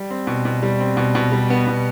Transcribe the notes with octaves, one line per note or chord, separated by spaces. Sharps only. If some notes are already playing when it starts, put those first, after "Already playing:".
Already playing: G3
C4
B2
B2
G3
C4
B2
B2
G3
B3
B2